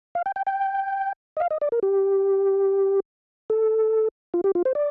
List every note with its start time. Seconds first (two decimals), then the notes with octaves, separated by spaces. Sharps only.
0.15 F5
0.26 G5
0.36 G5
0.47 G5
1.37 D#5
1.40 F5
1.51 D#5
1.61 D5
1.72 A#4
1.83 G4
3.50 A4
4.34 F4
4.44 G4
4.55 F4
4.65 C5
4.75 D5